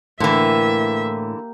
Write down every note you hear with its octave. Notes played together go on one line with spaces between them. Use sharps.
A2 D3 E3 A#3 G4 E5